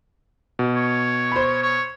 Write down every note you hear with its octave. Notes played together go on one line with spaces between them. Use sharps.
B2
C#5
C5 B5
C#5